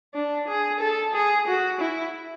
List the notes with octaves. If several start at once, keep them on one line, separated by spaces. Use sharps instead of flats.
D4
G#4
A4
G#4
F#4
E4